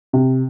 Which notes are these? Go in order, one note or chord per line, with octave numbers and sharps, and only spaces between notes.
C3